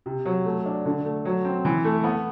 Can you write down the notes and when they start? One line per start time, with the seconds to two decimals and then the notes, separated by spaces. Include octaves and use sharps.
0.06 C3
0.25 F#3
0.45 A3
0.66 D4
0.85 D3
1.05 A3
1.25 F#3
1.45 C4
1.65 E3
1.84 A3
2.04 B3